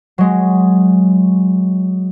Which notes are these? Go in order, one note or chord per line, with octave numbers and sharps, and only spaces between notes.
F#3 G#3